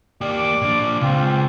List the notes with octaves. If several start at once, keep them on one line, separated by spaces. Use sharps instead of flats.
A#3 G4 D5 D6
A#2 D4
C#2 C4 F4